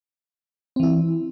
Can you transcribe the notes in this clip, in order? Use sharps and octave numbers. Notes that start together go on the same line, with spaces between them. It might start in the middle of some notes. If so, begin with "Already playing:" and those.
E3 C4 E4